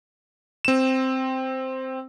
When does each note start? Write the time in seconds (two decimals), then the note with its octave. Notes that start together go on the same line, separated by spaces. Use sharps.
0.65 C4 E7